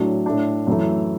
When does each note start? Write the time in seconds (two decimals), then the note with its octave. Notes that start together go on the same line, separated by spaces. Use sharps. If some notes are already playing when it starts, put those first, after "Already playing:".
Already playing: A2 F#3 D4
0.26 A2 A3 D4
0.67 F#2 E3 A3